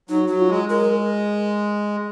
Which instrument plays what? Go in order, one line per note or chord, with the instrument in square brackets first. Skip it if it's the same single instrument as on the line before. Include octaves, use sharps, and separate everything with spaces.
[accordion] F#3 [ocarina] D#4
[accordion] F#3 [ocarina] F#4
[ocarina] F4
[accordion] G#3
[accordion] G#3 [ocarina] A#4